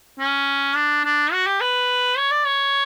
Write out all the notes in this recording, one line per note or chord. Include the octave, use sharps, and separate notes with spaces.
C#4
D4
D4
F#4
G4
B4
C#5
D5
C#5